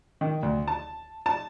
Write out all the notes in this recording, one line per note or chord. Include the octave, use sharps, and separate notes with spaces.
D#3
D2
A5
A5